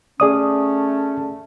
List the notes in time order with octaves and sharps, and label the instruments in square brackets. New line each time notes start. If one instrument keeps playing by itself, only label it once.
[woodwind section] A3 C#4 [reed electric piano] G#4 D5 D#6